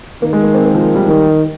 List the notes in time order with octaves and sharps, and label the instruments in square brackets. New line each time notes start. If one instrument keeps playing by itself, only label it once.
[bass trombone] D#3 [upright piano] A#3
[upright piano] G#3
A#3
C4
A#3
F3
G3
[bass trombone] D#3